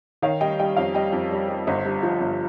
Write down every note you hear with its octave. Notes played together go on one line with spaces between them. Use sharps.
D#3 C#5 F5
G3 D#5 G5
G3 D#5 G5
F2 C#5 F5
G3 D#5 G5
F2
G3
G3
G1 C5 D#5
G2
F3
G1